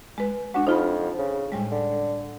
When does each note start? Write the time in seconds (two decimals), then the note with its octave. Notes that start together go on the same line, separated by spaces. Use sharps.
0.18 G#3 B4
0.54 G#3 D4 F#4
0.67 F2 D#4 F4 B5
1.18 C#3
1.52 A2 G3 G#3
1.71 D3